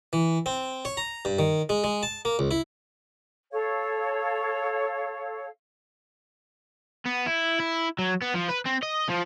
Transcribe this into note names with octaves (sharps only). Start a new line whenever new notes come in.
E3
C4
C#5
A#5
G2
D#3
G#3
G#3
A5
A#3
C#2
E4
A4 C#5 F5
B3
E4
E4
F#3
B3
F3
B4
C4
D#5
F3